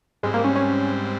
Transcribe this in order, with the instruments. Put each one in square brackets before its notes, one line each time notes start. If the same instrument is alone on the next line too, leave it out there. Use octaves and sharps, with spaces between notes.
[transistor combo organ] G#2 G3 C4 [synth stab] G#3
[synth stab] A#3
C#4
C#4